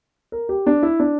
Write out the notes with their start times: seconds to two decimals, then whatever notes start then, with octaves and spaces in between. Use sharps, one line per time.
0.32 A#4
0.49 G4
0.67 D4
0.83 E4
1.00 D4